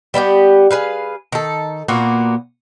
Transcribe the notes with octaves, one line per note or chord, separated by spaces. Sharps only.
G3 B3 E4 G4
G#4 B4 F5
D#3 A4
A#2 A#3 B3 F#4